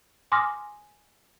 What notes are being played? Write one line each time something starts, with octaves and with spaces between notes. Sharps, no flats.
G#5 C6 D6 D#6 F6 A#6